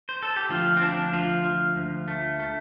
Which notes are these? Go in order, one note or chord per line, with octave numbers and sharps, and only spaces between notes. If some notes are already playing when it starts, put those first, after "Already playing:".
C5
A4
G4
D2 F3 F4
C4
F3 D4
D2 F3 F4
F3
D2
A3
A3